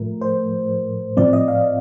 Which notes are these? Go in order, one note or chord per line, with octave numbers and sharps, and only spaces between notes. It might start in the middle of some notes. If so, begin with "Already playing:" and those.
Already playing: A2 F3 A3 A#4
C5
A2 F3 C4 D5
D#5
F5